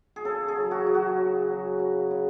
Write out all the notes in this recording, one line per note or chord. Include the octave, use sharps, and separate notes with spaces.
G#4
C#3 A4
G#4
F#3
F#4
F#3
F#4
C#3
F#3
C#3
C#3